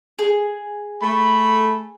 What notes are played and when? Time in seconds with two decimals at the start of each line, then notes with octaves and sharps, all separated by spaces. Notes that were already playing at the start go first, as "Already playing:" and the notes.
0.19 G#4
1.02 A3 B5